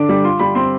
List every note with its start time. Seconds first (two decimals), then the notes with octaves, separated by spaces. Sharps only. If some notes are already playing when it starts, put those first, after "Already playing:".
Already playing: D3 D4 D6
0.09 G3
0.24 F4 C6
0.39 G3 B5
0.55 C4 C6